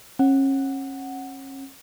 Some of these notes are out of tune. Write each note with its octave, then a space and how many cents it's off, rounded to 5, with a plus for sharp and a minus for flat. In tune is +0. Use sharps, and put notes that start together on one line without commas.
C#4 -35 F#5 +5